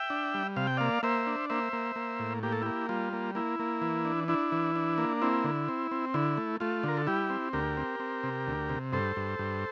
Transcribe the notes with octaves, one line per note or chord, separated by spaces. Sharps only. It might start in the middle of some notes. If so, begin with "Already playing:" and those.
Already playing: E5 G5
D4
G3
C3 F5
G5
A#3 D5 F5
A#3 C5 E5
D4
A#3 C5 E5
A#3
A#3
A2
A#3 G4
A4
A#3 E4 G4
G3 F4
A#3
A#3 E4
A#3
E3
D4
D4 E4
E3
D4
A#3
C4 E4
D3
C4
C4
D3 E4
A3
A3 F4
D3 A#4
A4
G3 E4 G4
C4
D2 G4 A#4
C4
C4
C3
D2
C3
G2 A4 C5
G2
G2